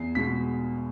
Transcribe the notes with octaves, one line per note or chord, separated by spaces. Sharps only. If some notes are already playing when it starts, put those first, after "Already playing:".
Already playing: E2 C7
B2 G#3 B6